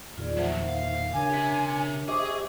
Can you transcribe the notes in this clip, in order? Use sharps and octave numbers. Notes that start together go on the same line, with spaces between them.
E2 A#2 D#3 F4 G#4 D5
F3 F#3 C5 E5 F#5
F5
C#3 D4 A#4 C#5 G#5
G4 E5
G4 G#4 C5 D#5 E5 C#6 D6